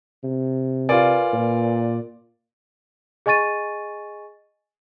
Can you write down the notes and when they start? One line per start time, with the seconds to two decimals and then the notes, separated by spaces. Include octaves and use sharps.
0.23 C3
0.89 F4 A#4 B4 D5 G#5
1.33 A#2
3.26 G#4 D#5 G#5 C#6 A6 D#7